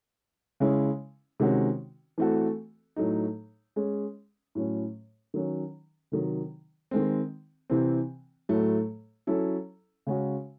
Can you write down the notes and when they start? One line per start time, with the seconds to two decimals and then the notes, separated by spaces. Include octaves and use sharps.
0.60 C#3 G#3 C#4 E4
1.40 C3 D#3 G#3 C#4 F#4
2.18 E3 A3 C4 F#4 A4
2.96 A2 F#3 A3 D#4
3.76 G#3 C#4 G#4
4.55 A2 F#3 C#4
5.34 D#3 F#3 C#4
6.12 C3 D#3 F#3
6.91 D#3 G#3 C4
7.70 C3 E3 C4
8.49 A2 F#3 A3
9.27 F#3 C#4 E4 A4
10.07 C#3 G#3 C#4 F#4